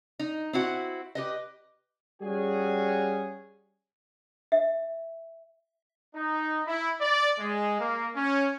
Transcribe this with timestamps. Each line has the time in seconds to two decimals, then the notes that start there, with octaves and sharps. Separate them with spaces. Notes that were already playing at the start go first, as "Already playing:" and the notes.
0.19 D#4
0.53 C4 E4 F#4
1.15 G4 B4 D#5
2.22 G3 C#4 F#4 G#4
4.52 E5
6.15 D#4
6.67 E4
7.01 D5
7.39 G#3
7.80 A#3
8.16 C#4